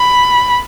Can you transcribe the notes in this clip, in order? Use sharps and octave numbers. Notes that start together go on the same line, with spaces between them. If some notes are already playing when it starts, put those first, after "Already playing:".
Already playing: B5